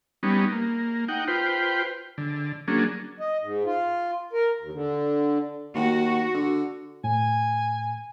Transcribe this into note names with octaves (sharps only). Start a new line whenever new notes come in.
G3 B3 C#4 D#4
A#3
D#4 F#5 G5
F4 B4 C5 G5
D3
F#3 A#3 C#4 D4 G#4
D#5
G#2
F4
A#4
D#2
D3
D#2 F#4
D3
A2 G#5